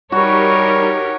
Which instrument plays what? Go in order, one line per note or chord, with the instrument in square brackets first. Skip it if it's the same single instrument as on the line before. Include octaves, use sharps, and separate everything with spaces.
[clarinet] G3 [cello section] D#4 G4 A#4 [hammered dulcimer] F#4 [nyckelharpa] C#5